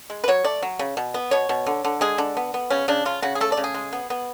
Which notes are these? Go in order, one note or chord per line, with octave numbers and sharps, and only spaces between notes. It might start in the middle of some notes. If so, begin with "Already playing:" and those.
G#3
B4
F#3 C#5
A3 D5
F#3
C#3
B2
B3
B2 C#5
B2
D3
D3
G#3 G#4
D3 D4
B3
B3
C#3 C#4
C#3 D4
C#3 F4
C#3 F#4
G#4
A3 A4
D5
C#3
G#4
G#3
B3
B3